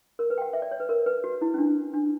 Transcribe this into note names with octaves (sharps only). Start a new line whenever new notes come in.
A#4
B4
G5
F#5
E5
D5
C#5
B4
A#4
B4
F#4
E4
C#4
D4
D4